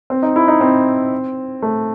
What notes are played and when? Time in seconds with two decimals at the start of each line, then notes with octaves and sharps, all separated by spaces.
0.10 C4
0.23 D#4
0.36 E4
0.48 D#4
0.61 C4
1.62 A3